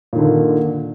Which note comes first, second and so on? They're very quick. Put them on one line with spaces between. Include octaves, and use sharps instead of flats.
A#2 D#3 D3